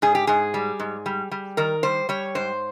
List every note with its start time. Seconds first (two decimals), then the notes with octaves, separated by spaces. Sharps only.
0.02 G#2 G#4
0.15 G4
0.27 G#2 G#4
0.54 G3
0.79 G#2
1.06 G3
1.31 G3
1.57 D#3 A#4
1.83 G3 C5
2.09 G3 C#5
2.35 G#2 C5